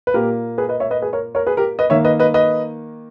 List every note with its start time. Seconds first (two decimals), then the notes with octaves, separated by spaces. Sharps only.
0.07 B4
0.14 A#2 A#3 G4 A#4
0.58 G#4 B4
0.69 B4 D#5
0.80 C#5 E5
0.91 B4 D#5
1.02 G#4 B4
1.13 A#4 C#5
1.35 A#4 C#5
1.47 G#4 B4
1.57 G4 A#4
1.79 B4 D#5
1.90 D#3 A#3 C#5 E5
2.05 B4 D#5
2.20 B4 D#5
2.34 B4 D#5